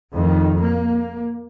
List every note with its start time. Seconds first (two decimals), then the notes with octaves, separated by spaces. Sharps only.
0.13 F2 A2 D#3
0.60 A#3